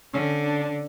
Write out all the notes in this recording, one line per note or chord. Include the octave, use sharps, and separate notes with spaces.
D3 C#4
D4